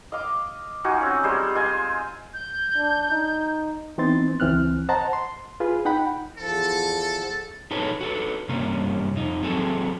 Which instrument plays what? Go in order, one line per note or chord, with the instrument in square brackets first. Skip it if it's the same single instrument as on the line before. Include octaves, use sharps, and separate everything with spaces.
[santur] D#5 F5 D6
D#4 F4 F#4 G#5
C4 C#4
G3 G#3 C5
F4 D#5 G#5
[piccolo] G6
[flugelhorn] D4
D#4
[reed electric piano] E3 B3 C4 D#4 C6 A6
C#2 E3 C4 F6 F#6
C5 D#5 F#5 A5 A#5
C6
F4 G#4 B4
D#4 F#5 G5 B5
[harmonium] E2 F3 [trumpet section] A4
[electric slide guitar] D#4 G#4 A4 B4 C#5
F#4 A4 B4
G2 C3 G3 A#3 C#4
F2 D#4
F#3 C4 F#4 G#4 A4